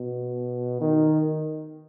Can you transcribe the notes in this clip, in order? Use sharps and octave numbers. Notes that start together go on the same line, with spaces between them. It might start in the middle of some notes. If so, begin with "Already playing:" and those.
Already playing: B2
D#3